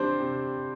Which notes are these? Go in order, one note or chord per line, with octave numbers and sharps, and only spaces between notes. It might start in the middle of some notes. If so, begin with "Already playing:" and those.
Already playing: C3 G3 C4 D4 C5
C3